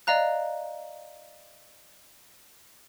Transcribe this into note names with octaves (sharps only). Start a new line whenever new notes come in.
D5 D#5 F5 A#5 F#6